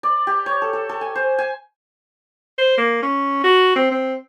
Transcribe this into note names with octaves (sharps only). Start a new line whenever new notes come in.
D5
G4
C#5
A4
A4
A4
G#5
C5
G#5
C5
A#3
C#4
F#4
C4
C4